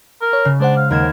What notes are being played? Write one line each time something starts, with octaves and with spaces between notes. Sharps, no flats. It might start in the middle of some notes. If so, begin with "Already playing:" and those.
A#4
C#5
C#3
G#3 D4 C5 F#5
F5
D#2 A#4 G#6 E7